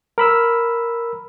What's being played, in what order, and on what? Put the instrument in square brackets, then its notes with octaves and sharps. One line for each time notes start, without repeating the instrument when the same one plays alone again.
[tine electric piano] A#4 B5 E6